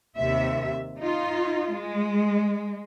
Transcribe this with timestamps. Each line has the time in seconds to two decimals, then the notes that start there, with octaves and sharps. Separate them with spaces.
0.16 D#2 C3 E5
0.98 D#4 F4
1.72 G#3